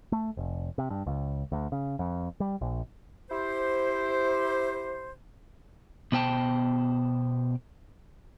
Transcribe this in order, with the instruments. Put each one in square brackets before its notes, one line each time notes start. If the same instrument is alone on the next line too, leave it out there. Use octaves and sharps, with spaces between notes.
[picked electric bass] A3
F1
C3
G2
C#2
D2
C#3
F2
G3
A#1
[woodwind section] E4 G4 C5
[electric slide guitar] B2 B3 C5 G5 A5